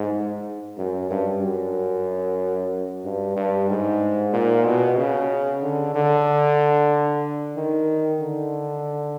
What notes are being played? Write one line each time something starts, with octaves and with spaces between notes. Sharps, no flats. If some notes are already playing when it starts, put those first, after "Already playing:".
Already playing: G#2
F#2
G2
F#2
G2
G2
G#2
A#2
B2
C#3
D3
D3
D#3
D3